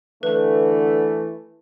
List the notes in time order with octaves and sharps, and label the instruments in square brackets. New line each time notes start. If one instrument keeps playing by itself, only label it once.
[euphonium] D3 [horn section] E3 A3 [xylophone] B4